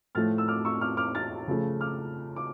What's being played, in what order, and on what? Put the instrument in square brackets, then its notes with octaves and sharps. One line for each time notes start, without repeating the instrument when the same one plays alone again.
[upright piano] A2 F3 A3 F6 A6
E6
D6 F6
C#6 E6
D6 F6
D6 F6
F6 A6
C#3 F3 A3
D6 F6
D6